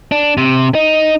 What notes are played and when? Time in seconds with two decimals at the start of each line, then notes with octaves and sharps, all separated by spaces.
0.12 D4
0.37 C3
0.75 D#4